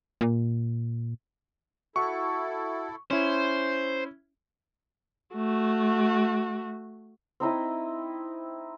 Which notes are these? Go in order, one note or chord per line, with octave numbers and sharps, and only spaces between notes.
A#2
E4 F#4 A4 E5 F#5 C#6
C#4 E4 C5
A3 F#4
C4 D#4 E4 D#5